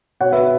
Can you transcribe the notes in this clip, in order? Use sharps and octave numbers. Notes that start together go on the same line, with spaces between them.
B2 C#5 F#5
B4 E5
B2